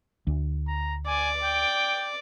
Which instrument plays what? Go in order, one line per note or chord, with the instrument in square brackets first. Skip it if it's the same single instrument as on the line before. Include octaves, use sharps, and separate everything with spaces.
[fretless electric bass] D2
[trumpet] A#5
[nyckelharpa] D5 [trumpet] G#5
[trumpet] G5